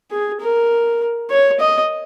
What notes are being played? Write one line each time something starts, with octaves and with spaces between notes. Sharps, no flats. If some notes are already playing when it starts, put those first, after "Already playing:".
G#4
A#4
C#5
D#5